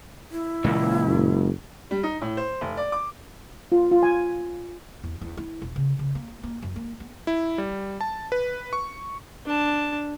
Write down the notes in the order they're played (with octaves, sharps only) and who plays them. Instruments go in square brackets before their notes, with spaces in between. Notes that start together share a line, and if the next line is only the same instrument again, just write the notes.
[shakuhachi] E4
[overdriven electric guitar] C#2 [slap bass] A#2 E3 A#3
[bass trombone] F#1
[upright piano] G3
D#4
A2
C5
F1
D5
D6
[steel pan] F4
F4
G#5
[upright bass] E2
E2
E4
E1
C#3
C#3
A#3
A#3
F#2
A#3
B3
[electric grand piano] E4
G3
A5
B4
C#6
[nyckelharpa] D4 A5